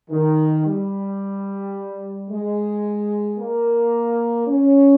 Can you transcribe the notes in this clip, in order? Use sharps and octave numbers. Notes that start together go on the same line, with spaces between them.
D#3
G3
G#3
A#3
C#4